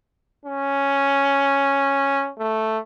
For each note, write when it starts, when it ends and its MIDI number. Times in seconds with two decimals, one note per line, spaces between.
0.45 2.30 61
2.38 2.78 57